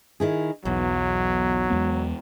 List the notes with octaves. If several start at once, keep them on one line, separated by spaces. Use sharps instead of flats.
D#3 E4 G#4
B1 E2 F#3
E2 G#3 B3